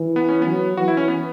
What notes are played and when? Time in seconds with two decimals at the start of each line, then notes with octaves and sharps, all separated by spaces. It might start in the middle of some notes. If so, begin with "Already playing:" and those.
Already playing: E3
0.16 B3
0.29 C#4
0.42 B3
0.47 F#3
0.77 E3 F#4
0.88 E4
0.97 C#4
1.08 B3